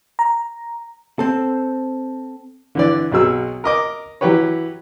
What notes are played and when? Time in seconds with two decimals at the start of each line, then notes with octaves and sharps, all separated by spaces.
0.19 A#5
1.19 C4 A4
2.75 D3 E3 D5
3.12 B1 B2 F#3 G#4 E6
3.64 A#4 D#5 D6
4.21 E3 F#3 G4 B4 C#5